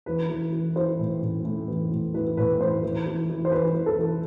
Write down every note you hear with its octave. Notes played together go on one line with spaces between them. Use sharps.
E3 B4
E3
E3
E3 C5
A2
A2
A2
E3
A2
E3 B4
A2 B4
E3 C5
E3
E3
E3
C5
E3 B4
E3
A4
E3